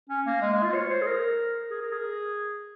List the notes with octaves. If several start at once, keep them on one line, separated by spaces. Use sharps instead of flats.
C#4
A#3
G#3
G#3
F4
C#5
C5
G#4
A#4
G#4
A#4
G#4